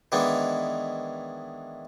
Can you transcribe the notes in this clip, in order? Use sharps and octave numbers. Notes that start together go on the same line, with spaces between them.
D#3 E3 G#3 B3 D4